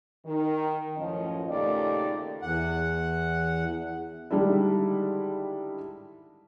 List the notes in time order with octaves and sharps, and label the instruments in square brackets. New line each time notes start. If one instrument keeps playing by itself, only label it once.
[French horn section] D#3
F#2 A2 F3 C#4 D#5
D#2 A#2 C#3 A3 G4 D5
[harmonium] E2 F#5
[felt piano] D3 D#3 G3 G#3 D4 E4